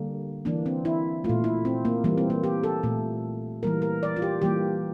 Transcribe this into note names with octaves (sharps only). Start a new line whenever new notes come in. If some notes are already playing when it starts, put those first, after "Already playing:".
Already playing: D3 G3 A#3
E3 A#3 D4
C4
E4
A#2 A3 F4
E4
C4
A#3
E3 G3 A#3
C4
A#3
G4
A4
A#2 A3
E3 G3 A#3 A#4
A#4
D5
F4
G4
E3 G3 A#3 G4